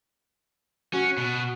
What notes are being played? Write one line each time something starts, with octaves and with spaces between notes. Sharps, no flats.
C#4 F#4
B2